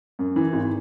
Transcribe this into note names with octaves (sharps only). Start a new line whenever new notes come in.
F#2
E3
G#1